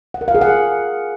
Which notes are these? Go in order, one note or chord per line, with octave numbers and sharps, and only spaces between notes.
F#5
A#4
F5
G#4
F#5